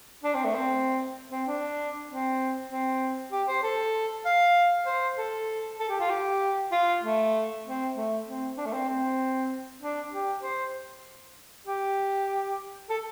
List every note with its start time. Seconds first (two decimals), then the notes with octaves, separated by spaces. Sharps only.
0.24 D4
0.34 C4
0.45 A3
0.55 C4
1.31 C4
1.47 D4
2.09 C4
2.70 C4
3.32 G4
3.48 C5
3.63 A4
4.25 F5
4.86 C5
5.17 A4
5.79 A4
5.89 G4
6.00 F4
6.10 G4
6.72 F4
7.03 A3
7.65 C4
7.96 A3
8.26 C4
8.57 D4
8.66 A3
8.73 C4
8.88 C4
9.81 D4
10.12 G4
10.43 C5
11.67 G4
12.90 A4